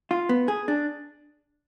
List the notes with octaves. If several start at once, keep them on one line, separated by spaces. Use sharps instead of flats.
F4
B3
G#4
D4